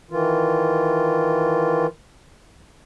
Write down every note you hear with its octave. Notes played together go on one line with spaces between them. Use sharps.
D#3 E3 F4